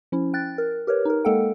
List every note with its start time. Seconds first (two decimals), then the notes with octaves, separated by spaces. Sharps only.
0.12 F3 C#4 E4
0.34 G5 F#6 A6
0.58 A#4
0.87 G4 A#4 B4 C#5
1.05 D#4 A#4
1.25 G#3 A#3 A4 F#5 G5